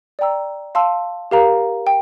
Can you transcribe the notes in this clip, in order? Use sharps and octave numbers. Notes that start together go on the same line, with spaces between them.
D5 G5 A#5 E6
F5 A5 C6 E6
G4 A#4 F5 A#5
G5